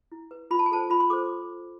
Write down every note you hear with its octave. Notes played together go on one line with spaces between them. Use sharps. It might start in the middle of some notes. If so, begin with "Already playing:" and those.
E4
B4
F4 B5
A5
G#5
A4 C5 A5
F4 B5
C6
A4 C5 D6